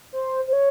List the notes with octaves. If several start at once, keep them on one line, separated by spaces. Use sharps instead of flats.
C5
C5
C#5